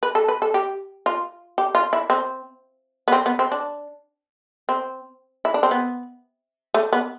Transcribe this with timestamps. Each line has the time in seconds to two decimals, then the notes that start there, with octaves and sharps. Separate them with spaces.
0.03 B4
0.15 A4
0.28 B4
0.42 A4
0.54 G4
1.06 F4
1.58 G4
1.75 F4
1.93 E4
2.10 C4
3.08 B3
3.12 C4
3.26 B3
3.39 C4
3.52 D4
4.69 C4
5.45 E4
5.54 D4
5.63 C4
5.71 B3
6.74 A3
6.93 B3